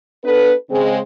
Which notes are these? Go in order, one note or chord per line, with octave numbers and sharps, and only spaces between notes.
B3 D4 A4 B4
C#3 G#3 C4